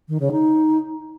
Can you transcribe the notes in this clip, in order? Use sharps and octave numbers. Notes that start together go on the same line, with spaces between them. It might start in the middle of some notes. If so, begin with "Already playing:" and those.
D#3
C#3
D#4